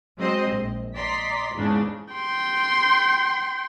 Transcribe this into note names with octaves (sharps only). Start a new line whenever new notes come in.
F#3 G#3 C4 C5 D#5
A#1
D5 D#5 A#5 C6 B6
E2 G#2 C#3 D4
G5 C6